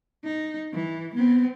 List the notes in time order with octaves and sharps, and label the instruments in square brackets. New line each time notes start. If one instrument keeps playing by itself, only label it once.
[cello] D#4
E3
B3 C4